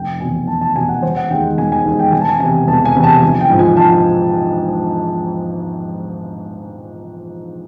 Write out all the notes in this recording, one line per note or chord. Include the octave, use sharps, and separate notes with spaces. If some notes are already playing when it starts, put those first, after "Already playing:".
Already playing: F1 G5
E2 B2 G#5
F1 A5
A5
E2 B2 G#5
F#5
E1 C5
F#5
D#2 D#3 G#3 G5
E1 G#5
G#5
D#2 D#3 G#3
G5
E1 G#5
A5
G#5
E2 C3 G#5
E1 A5
G#5
E2 C3
A5
A#1 G#5
G5
G#2 F3
G#5
A#1 A5